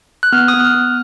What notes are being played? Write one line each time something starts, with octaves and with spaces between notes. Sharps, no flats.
F#6
B3 F6
D#6
B3
F#6
F6
B3